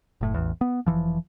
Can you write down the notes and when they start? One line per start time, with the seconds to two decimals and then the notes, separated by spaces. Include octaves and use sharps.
0.21 F#1 A2
0.34 A1 E2
0.61 B3
0.86 F1 D2 E3 F3